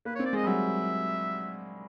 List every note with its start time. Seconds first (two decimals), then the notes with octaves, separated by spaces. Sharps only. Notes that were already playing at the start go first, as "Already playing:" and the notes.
0.05 A#3 B4
0.15 C#5
0.19 C4
0.26 D5
0.33 G#3 D#5
0.43 G3
0.47 F#3 E5